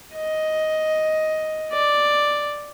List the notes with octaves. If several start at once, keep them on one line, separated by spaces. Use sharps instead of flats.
D#5
D5